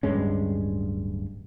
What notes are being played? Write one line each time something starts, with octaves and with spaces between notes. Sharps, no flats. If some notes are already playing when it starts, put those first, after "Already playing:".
D1 G2 G#3 C#4